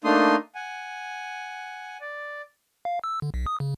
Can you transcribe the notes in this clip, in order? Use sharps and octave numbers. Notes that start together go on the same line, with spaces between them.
A3 A#3 D4 D#4 C6 D#6
F#5 G#5
D5
F5
E6
D3
B1
D#6
C#3